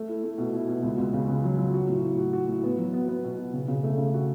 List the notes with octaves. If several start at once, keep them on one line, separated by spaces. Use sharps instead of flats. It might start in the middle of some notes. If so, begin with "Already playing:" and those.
Already playing: A3
E4
A3
B2
E4
B2
C#2
C#2
C#3
C#3
F#3
F#3
F#4
A2
A2
F#4
F#4
A2
B3
F#3
B3
B3
B2
B2
C#3
C#3
A3
C#3
F#4